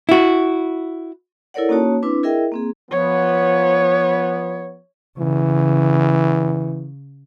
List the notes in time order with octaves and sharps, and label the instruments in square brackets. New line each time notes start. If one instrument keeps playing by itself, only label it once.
[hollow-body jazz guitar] E4 F#4
[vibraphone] E4 A4 A#4 C#5 D5 F#5
A#3 C#4 D#4 F#4 C#5 A5
C4 D4 E4 B4 D6
E4 G#4 A#4 D#5 E5 G5
A#3 C4 G#4
[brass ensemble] F3 B3 [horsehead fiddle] C#5
[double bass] C#3 [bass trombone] E3